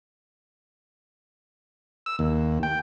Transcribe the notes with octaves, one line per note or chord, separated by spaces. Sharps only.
E6
D#2
G5